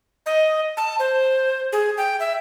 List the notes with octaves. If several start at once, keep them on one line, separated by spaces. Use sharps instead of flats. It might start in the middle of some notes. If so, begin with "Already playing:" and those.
D#5
A5
C5
G#4
G5
E5